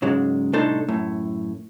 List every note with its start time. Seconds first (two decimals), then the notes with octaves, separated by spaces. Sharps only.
0.02 G#2 C#3 F#3 G#3
0.53 C2 A2 D4 D#4 A4 C5
0.88 F#2 A2